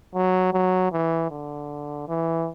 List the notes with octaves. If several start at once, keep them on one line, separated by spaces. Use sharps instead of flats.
F#3
F#3
E3
D3
E3